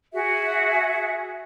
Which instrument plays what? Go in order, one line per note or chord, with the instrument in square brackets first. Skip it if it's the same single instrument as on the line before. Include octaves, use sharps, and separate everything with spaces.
[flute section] F#4 G#4 E5